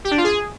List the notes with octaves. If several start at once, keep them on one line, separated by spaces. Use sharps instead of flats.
G4
D4
F4
G#4